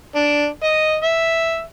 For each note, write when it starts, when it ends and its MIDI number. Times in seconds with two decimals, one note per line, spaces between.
0.15 0.46 62
0.63 0.95 75
1.03 1.62 76